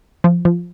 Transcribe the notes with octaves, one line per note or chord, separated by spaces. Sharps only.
F3
F3